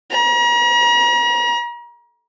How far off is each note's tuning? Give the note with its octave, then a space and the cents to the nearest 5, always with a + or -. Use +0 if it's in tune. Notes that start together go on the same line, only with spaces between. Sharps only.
A#5 +40